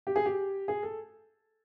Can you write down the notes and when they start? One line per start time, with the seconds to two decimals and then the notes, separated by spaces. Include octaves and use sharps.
0.07 G4
0.16 G#4
0.25 G4
0.68 G#4
0.83 A4